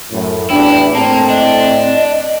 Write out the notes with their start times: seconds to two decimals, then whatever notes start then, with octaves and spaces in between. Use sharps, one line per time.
0.11 F#2 A2
0.50 A1 E2 D4 E4 G5
0.95 A2 A#3 C4 A5
1.29 D4 D#5